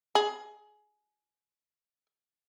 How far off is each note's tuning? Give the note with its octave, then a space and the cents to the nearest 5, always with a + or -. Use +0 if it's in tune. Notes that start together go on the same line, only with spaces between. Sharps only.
G#4 +20